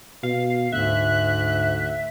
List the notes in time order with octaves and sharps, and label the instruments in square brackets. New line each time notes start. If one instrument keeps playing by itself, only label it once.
[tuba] B2 [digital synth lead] F5
[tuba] D2 [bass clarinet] G#2 [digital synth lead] E5 [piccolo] F#6